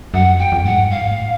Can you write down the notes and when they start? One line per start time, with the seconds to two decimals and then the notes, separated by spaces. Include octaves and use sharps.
0.14 F#2 F#5
0.33 F2
0.39 G5
0.52 F2
0.65 G#2 F#5
0.71 G2
0.90 G#2 F5
1.09 A2